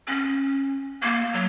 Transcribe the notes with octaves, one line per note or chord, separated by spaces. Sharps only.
C#4
A#3
F#3